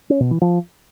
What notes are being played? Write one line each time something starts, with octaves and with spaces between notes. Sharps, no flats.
C#4
B2
E3
F3